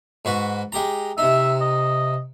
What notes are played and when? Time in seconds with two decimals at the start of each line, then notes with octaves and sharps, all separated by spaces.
0.25 G#2 F#4 B4
0.72 G#3 G4 A#5
1.18 C3 D#4 E5
1.61 D#5